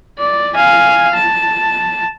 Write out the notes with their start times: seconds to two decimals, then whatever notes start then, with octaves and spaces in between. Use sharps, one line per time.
0.19 D5
0.55 F5 G#5
1.14 A5